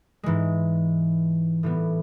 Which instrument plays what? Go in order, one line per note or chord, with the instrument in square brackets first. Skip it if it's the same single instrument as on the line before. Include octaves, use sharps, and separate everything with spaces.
[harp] G#2 E3 G#3
A2 E3 G3 B3